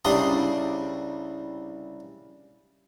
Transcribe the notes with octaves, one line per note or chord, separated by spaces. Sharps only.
C2 C#3 G3 D4 C6 D#6